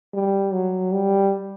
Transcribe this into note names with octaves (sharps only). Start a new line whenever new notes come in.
G3
F#3
G3